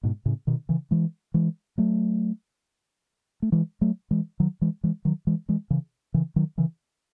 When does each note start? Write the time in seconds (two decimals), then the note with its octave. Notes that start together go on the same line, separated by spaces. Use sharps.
0.03 G#2 B2
0.26 A2 C#3
0.47 B2 D#3
0.69 C#3 E3
0.91 E3 G#3
1.34 E3 G#3
1.78 F#3 A3
3.42 A3
3.52 E3 G#3
3.81 F#3 A3
4.11 E3 G#3
4.40 D#3 F#3
4.61 E3 G#3
4.84 E3 G#3
5.05 D#3 F#3
5.27 E3 G#3
5.49 E3 G#3
5.70 C#3 E3
6.14 C#3 E3
6.36 D#3 F#3
6.58 C#3 E3